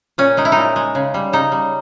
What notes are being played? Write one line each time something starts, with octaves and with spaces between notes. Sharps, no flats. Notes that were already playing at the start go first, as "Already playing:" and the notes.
A#2 C#4
G#3 D#4
E4
A#2 D#4
G#3
C#3
G3
C#3 D#4
G3